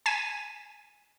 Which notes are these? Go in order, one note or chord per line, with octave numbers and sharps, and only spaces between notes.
G#5 B6 D#7 E7